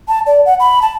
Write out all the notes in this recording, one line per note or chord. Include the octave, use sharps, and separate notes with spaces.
A5
D5
F#5
B5
A5